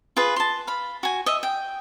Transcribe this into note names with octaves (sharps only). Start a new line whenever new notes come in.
F4 G#4 B4
A5 C6
F5 B5
F#4 G#5
D#5 E5
G5